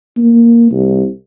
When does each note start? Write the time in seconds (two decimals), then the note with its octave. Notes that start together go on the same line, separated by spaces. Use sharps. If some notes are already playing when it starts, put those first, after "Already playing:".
0.17 A#3
0.72 C2